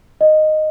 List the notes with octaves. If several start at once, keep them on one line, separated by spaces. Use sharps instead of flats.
D#5